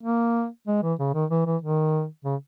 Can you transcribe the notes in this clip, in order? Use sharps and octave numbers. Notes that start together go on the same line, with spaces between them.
A#3
G#3
E3
C#3
D#3
E3
E3
D#3
C#3